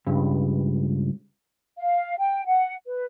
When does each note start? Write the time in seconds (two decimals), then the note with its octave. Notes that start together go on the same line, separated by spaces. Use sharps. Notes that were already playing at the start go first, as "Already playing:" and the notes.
0.07 C#2 G2
1.78 F5
2.18 G5
2.46 F#5
2.87 B4